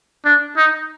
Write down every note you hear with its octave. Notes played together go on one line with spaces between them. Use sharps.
D4
D#4